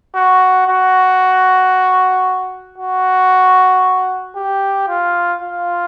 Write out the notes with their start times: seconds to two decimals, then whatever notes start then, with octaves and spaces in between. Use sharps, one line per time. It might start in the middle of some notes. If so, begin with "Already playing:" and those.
0.15 F#4
0.67 F#4
2.78 F#4
4.36 G4
4.88 F4
5.41 F4